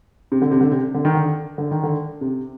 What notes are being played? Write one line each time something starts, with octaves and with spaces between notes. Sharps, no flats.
C3
D3
C3
D3
C3
D3
D#3
D3
D3
D#3
D3
C3